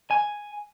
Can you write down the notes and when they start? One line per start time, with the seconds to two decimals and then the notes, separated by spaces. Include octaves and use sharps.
0.11 G#5